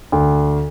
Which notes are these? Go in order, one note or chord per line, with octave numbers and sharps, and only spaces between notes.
D2